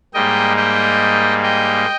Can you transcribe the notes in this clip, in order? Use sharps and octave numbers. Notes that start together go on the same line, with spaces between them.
G#2 G3 A#3 D#5 G5
D#5 G5
D#5 G5